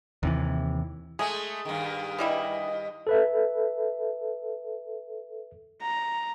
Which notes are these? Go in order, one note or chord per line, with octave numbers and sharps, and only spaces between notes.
D#2 C3 E3
G#3 A3 G#4
G2 D#3
E3 G3 E4 D#5
A4 B4 E5
A#5